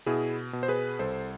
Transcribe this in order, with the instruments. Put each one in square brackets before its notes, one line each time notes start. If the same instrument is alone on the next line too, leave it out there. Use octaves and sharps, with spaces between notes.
[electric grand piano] B2 E4 G#4
B2
C5
G#4 B4
C2 A4 C5